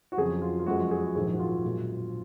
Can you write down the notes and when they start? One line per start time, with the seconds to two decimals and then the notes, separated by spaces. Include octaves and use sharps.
0.12 F#4
0.17 F2 C#3 F#3 G#4
0.42 F4
0.59 F4
0.66 F#1 F#2 F3 G#3 F#4
0.91 G#4
1.15 A#1 G#2 D#3 F#3 G#4
1.34 F#4
1.39 F4
1.64 B1 A#2 G#3